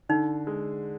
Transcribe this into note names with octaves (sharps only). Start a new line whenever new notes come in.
D3 D#4
G#3